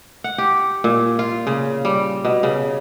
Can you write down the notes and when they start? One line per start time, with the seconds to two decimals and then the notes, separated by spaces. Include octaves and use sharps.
0.24 F#5
0.38 G4
0.84 A#2
1.19 F4
1.47 C#3
1.85 G3
2.25 B2
2.43 C#3